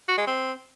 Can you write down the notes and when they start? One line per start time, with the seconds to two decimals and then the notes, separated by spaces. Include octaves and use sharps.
0.08 F#4
0.18 G#3
0.27 C4